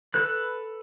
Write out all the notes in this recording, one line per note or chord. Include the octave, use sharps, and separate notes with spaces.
A4 B4 F#6